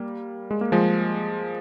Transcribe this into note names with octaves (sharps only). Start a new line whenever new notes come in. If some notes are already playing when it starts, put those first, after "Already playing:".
Already playing: G3 A#3
G#3
A#3
F3 G#3